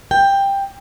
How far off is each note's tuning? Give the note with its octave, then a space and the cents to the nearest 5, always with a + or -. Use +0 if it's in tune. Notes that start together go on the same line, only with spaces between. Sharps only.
G5 +10